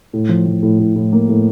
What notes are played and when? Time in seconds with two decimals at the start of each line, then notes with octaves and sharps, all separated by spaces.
0.13 A2
0.29 F3
0.46 F3
0.63 A2
0.80 A2
0.96 A2
1.13 A#3
1.29 A2